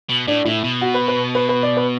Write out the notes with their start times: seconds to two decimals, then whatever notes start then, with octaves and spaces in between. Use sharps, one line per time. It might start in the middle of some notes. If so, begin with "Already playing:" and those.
0.09 B2
0.27 A2 D4
0.45 A2 E4
0.64 B2
0.81 F#4
0.94 B4
1.08 B4
1.35 B4
1.49 B4
1.63 D5
1.77 B4